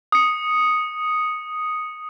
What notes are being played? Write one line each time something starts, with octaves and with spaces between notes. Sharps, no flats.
D#6 C#7